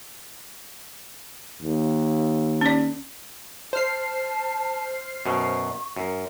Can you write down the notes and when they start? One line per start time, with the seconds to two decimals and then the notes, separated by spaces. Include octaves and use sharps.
1.62 D#2
2.61 C#4 D5
3.73 C5 A5 F6 C7
5.26 F#2 B2 C#6
5.96 F#2 A#4